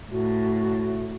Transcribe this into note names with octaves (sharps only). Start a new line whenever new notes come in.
A2 F#4